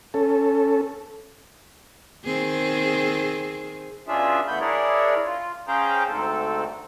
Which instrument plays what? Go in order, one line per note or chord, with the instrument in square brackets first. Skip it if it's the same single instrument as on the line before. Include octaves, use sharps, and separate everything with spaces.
[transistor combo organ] C#4 A4
[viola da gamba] D#3 C4 G#4
[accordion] B2 C#4 D4 F4 G#4 E5
E2 A3 B3 B5 G6
D4 E4 G#4 A#4 C#5 D5
F4
C#4 G#4 C5 F5 G5 A#5
D2 G#2 C4 A4